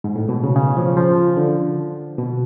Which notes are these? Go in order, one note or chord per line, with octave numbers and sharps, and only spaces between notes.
G#2
A2
B2
C#3
C#3
F3
F3
D3
B2